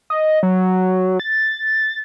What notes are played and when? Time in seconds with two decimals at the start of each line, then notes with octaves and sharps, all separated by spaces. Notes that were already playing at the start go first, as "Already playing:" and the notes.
0.10 D#5
0.43 F#3
1.20 A6